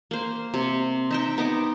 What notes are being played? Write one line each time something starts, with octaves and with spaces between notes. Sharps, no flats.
A#3 C5
C3
D#4 E5 G5
B3 D#4 D6